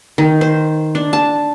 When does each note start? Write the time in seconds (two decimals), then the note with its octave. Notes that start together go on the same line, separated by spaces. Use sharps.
0.18 D#3
0.41 C5
0.95 D4
1.13 A5